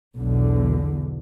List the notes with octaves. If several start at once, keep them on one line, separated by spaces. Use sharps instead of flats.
B1 E2 B2 D3